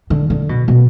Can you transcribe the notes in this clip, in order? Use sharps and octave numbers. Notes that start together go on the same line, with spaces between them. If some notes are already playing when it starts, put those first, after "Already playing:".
D3
D3
B2
B2